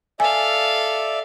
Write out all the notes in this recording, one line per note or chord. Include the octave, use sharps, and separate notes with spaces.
A4 D5 E5 F5 G#5